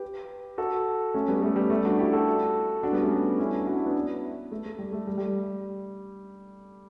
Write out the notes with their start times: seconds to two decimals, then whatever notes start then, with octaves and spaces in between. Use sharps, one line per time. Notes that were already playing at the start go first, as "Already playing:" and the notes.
Already playing: G4 B4
0.58 F#4 A4
1.14 A3 C#4
1.28 G3 B3
1.42 A3
1.56 G3
1.70 A3
1.85 D4 F#4
1.98 E4 G4
2.12 F#4 A4
2.83 D4 F#4
2.92 G3 B3
3.02 A3 C#4
3.38 C#4 E4
3.52 D4 F#4
3.66 D4 F#4
3.76 C#4 E4
3.86 B3 D4
4.52 A3
4.65 A3
4.79 G3
4.93 A3
5.07 G3
5.18 G3